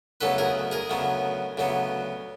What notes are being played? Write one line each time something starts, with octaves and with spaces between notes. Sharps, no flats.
D2 C#3 F#3 B3 A4 B4
G#4 A#4
G#4 A#4
D2 C#3 F#3 B3
D2 C#3 F#3 B3